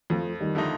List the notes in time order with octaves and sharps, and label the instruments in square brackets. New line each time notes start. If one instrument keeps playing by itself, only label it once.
[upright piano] F2 [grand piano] F3 A3
[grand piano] D#3 G3
[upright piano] D3 F3 A3 D#4